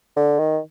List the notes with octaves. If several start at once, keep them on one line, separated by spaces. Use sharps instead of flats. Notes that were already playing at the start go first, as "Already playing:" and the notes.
D3
D#3